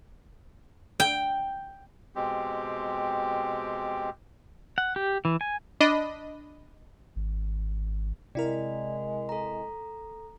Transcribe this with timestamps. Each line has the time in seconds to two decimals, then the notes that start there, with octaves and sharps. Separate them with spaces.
1.00 G5
2.16 B2 G#3 C4 G4
4.78 F#5
4.96 G4
5.25 E3
5.41 G#5
5.81 D4 D#5 B5
7.16 G#1
8.35 C3 G#3 E4 A#4 D5
9.29 A4 A#5